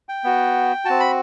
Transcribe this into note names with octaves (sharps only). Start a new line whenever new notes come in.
G5
B3 F#4
C4 F#4 A5
B5